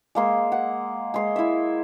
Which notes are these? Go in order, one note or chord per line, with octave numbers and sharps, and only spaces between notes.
G#3 A#3 C6
F#5
G#3 C6
E4 E5